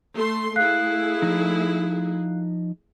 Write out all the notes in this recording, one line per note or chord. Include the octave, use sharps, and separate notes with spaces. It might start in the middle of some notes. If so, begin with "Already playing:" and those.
A3 C6
A3 E4 G#4 F5 F#6 C7
F3 D#4